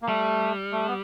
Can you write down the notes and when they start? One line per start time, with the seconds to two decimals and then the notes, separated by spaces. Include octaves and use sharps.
0.02 A#3
0.07 G3 A3
0.72 A3
0.88 B3